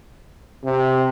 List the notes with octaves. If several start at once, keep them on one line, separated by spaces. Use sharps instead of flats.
C3